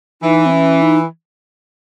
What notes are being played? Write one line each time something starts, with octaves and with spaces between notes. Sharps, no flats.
E3 D#4
C4
C#4
D#4